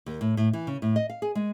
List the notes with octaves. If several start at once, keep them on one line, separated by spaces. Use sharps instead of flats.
D#2
A2
A2
E3
C#3
A2
D#5
F5
G#4
G#3